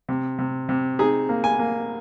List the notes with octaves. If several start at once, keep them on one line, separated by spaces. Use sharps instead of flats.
C3
C3
C3
D#4 G#4
A#3
G#5
A#3